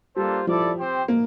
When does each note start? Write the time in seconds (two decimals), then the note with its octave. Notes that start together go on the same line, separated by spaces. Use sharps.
0.16 G3 A#3 D4 F4 A4 C5
0.47 F3 E4 A4 D5
0.77 C4 G4 C5 G5
1.08 A#3